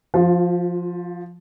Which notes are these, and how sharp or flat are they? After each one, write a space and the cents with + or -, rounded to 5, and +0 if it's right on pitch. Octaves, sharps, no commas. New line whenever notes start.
F3 +0 F4 +40